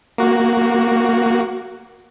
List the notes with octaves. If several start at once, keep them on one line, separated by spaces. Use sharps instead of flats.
A#3 F#4